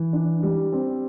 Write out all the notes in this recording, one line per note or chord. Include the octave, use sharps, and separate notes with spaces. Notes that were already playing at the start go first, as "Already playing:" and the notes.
Already playing: E3
D4
G3
C4